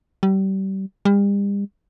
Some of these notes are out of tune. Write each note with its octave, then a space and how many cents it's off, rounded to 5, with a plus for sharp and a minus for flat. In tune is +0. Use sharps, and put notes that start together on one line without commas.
G3 -30
G3 +40